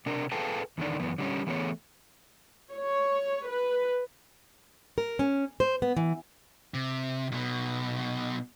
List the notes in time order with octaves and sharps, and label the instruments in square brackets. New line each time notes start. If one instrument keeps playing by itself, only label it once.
[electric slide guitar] C3 D4 A#4
G#4 A4 B4 F5 G5 A5
E2 D3 D#3 D5
F#2 E3 B3
D3 G3 C#4
E3 A3 B3 G#4 C#5
[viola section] C#5
B4
[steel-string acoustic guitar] A#4
C#4
C5
B3
E3
[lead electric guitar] C3
B1 B2